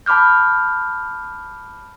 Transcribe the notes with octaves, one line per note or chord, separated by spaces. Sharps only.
A5 B5 D6 F6 G6